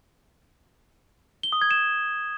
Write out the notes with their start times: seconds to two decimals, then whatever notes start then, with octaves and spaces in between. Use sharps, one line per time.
1.43 G7
1.52 D#6
1.62 G#6
1.71 E7